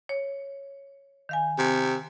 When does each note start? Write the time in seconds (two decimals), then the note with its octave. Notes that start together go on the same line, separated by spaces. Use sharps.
0.09 C#5
1.29 D#3 F5 G#5
1.58 C3